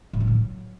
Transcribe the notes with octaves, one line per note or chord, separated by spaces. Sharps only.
A2
D3
F#3